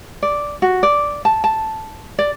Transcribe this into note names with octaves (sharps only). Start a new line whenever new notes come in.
D5
F#4
D5
A5
A5
D5